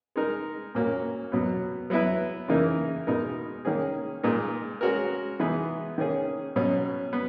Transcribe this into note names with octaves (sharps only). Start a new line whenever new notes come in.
G#3 D#4 A#4
A#2 A#3 C#4 F#4
B2 F#3 B3
F#3 B3 E4 B4
C#3 E3 A#3 D#4 A#4
B2 G#3 D#4 A#4
D#3 A#3 C#4 G#4
A#2 G#3 D#4 A#4
G#3 C#4 F#4 A#4
E3 G#3 B3 D#4 G#4
D#3 A#3 C#4 G#4
B2 F#3 C#4
B3